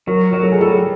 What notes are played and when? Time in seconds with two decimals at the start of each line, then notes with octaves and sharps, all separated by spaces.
0.07 F#3 A#4
0.33 F#3 A#4
0.43 A4
0.51 G#4
0.58 G3 A4